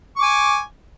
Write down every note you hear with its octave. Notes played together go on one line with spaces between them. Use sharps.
G#5 C#6 D6